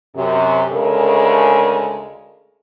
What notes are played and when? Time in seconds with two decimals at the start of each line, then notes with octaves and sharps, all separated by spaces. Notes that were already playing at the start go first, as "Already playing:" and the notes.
0.16 F#2 C3
0.71 D2 C#3 G#3 A4 A#4